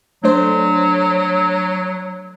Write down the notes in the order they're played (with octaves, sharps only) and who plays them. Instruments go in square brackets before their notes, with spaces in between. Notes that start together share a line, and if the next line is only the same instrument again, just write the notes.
[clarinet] F#3 [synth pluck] A3 D4 C5